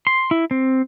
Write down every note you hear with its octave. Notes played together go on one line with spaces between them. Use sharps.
C6
E4
C4